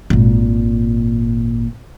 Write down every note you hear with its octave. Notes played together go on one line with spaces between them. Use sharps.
G#1 A#2